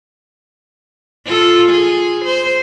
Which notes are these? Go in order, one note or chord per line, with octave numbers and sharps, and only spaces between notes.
F4 A4
G#4
C5